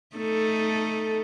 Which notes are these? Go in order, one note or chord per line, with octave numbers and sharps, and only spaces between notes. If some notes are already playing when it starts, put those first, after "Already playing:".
A3 D#4 A4